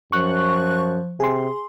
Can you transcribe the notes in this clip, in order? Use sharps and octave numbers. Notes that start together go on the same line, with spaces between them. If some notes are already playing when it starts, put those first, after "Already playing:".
F#2 F3 C#6 F#6
C3 G#4 C6